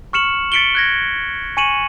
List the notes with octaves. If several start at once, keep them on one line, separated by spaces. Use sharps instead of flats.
C#6 F6 C#7 E7 F#7
A6 B6 C#7 D7 F#7 G7
F#6 G#6 A#6
G#5 C#6 C#7 D#7 E7 F#7